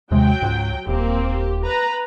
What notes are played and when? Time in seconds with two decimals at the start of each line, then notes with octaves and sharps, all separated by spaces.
0.11 D#2 C3 F#3 G#3 G5
0.42 C#2 G#2
0.87 D#1 A#3 C4 G4
1.33 G4
1.65 B4 A#5